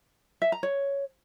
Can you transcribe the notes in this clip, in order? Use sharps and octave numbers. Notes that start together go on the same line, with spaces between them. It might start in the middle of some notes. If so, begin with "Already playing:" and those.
E5
A#5
C#5